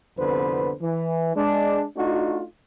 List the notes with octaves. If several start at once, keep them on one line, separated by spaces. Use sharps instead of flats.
C2 F2 D3 B3 B4 C5
E3
G#3 D4
A3 D4 D#4 F4 F#4